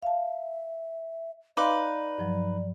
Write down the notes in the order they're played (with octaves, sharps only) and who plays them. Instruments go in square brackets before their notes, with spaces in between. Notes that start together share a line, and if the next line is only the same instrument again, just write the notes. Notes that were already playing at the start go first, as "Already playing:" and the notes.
[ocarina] E5 [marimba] F5 A5
[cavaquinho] D#4 B4 D6 [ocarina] D5 [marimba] F5 C6
[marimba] G2 F3 F#3